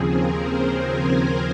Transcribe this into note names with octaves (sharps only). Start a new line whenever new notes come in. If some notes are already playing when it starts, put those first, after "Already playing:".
Already playing: D#2 C#3 F3 C4 G#4
A#4
C5
G#5